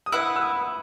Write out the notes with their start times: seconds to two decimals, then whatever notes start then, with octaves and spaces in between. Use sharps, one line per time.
0.06 D#6
0.12 E4 B4 F#5 E6
0.36 E6
0.42 D#6